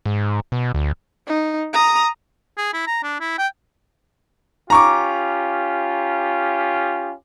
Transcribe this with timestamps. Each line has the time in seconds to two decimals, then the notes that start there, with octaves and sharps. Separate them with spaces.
0.06 G#2
0.52 B2
0.74 D2
1.28 D#4
1.74 A#5 D#6
2.58 G#4
2.73 E4
2.87 A#5
3.03 D4
3.20 E4
3.39 G5
4.70 C#4 F4 G4 A#5 C#6 D6